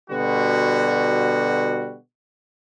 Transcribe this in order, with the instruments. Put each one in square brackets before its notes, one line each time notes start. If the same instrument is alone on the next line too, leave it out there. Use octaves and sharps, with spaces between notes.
[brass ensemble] B2 D3 G3 F#4